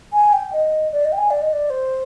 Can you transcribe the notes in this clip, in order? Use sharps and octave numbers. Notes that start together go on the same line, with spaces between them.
G#5
G5
D#5
D5
D#5
G5
G#5
D5
D#5
D5
C5